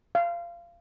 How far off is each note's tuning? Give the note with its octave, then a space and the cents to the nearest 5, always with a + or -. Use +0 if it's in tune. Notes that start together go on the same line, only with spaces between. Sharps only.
F5 -25